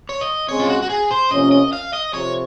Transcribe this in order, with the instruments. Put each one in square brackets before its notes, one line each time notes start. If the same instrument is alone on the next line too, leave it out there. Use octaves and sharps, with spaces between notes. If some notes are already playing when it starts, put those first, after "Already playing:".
[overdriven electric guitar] C#5
D#5
[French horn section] C#3 G#3 C4 [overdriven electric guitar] C#5
[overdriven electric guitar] F4
F#4
F#4
G#4
C5
[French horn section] C3 F3 A#3 C#4 [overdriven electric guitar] D#5
[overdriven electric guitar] D#5
F5
D#5
[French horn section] F2 C3 [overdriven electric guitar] C#5